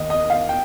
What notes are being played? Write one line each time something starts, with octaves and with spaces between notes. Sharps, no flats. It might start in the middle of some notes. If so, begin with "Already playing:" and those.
Already playing: D#2 D#5
D#5
F5
G5